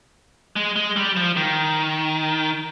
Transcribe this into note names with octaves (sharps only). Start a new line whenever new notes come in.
G#3
G#3
G3
F3
D#3